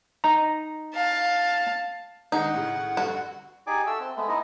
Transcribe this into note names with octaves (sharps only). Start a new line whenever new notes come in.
D#4 A#5
F5 A5
D#3 G#3 D4 D#4 F#5
A2 C#3
G2 D3 F#4
D#4 G4 G#4 D5 G#5 D6
F#4 A4 E5 E6
C4
G#3 A3 B3
B3 D#4 E4 D#5